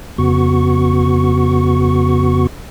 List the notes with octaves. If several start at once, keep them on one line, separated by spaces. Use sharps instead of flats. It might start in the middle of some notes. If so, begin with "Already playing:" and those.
F2 C#3 B3 F#4 C#6